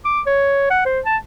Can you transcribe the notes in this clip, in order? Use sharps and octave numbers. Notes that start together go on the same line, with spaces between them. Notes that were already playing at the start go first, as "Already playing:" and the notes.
D6
C#5
F#5
C5
A5